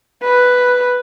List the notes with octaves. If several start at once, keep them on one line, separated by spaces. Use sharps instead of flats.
B4